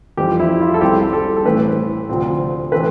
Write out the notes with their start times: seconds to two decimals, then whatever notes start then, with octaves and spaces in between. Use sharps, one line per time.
0.17 F2 E3 G3 C4 G4
0.39 E4
0.60 F4
0.74 A4
0.81 C2 C3 G3 C4 G4
1.13 A4
1.36 A4
1.45 A2 E3 A3 C4 B4
2.09 D2 C3 F3 C4
2.72 A2 E3 A3 C4 B4